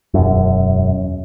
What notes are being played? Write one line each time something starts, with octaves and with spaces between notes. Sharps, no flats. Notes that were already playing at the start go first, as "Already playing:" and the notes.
E1 F#2